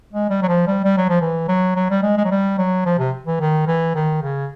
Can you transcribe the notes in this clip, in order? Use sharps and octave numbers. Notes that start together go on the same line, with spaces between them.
G#3
G3
F#3
F3
G3
G3
F#3
F3
E3
F#3
F#3
G3
G#3
G#3
F#3
G3
F#3
F3
C3
E3
D#3
E3
D#3
C#3